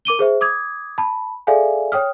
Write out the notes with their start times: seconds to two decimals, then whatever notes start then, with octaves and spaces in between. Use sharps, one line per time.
0.05 A#4 D6 D#7 G7
0.19 G#4 C5 E5
0.41 D6 D#6 G#6
0.98 A5 B5
1.47 G#4 A4 D5 E5 F5 G#5
1.92 C#5 G5 D#6 F6